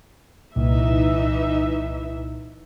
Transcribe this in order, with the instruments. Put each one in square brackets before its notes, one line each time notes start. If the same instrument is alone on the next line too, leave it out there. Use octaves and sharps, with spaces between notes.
[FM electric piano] C2 A#2 [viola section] E3 D#4 E5